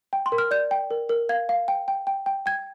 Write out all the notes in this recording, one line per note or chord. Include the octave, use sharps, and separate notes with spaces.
G5
C6
A#4
F6
D5 G6
G5
A#4
A#4
F5 G#6
F5
G5
G5
G5
G5
G5 G#6